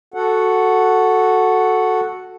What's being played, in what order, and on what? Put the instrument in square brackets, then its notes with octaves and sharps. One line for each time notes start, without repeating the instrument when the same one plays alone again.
[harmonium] F#4 A4 F#5